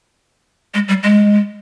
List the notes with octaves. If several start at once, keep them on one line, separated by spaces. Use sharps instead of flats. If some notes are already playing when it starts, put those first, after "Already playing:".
G#3
G3
G#3